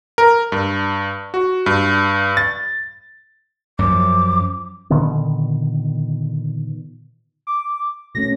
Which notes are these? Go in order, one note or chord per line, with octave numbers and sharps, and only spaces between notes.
A#4
G2
F#4
G2
A6
F#2 F3 D6
A#2 D3 D#3 B3
D6
B2 A3 C#4 A#6